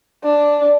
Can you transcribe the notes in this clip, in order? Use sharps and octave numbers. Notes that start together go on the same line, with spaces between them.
D4